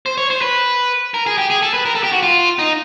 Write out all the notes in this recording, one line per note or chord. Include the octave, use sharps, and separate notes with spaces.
C5
C#5
C5
B4
A#4
G#4
G4
G#4
A4
B4
A#4
A4
G4
F#4
F4
D#4